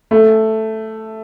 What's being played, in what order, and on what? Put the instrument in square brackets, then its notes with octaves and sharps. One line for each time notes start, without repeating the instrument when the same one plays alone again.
[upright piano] A3